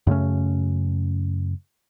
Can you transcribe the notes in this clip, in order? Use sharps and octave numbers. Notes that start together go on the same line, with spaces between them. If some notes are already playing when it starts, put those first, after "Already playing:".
F#2 C#3 A3 C#4